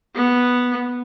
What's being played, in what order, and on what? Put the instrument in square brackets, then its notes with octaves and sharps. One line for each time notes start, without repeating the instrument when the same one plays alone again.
[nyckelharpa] B3